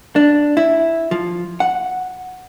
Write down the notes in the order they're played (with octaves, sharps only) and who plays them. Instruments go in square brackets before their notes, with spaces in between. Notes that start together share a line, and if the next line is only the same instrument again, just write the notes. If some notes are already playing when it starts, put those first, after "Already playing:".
[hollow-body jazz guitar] D4
E4
F3
F#5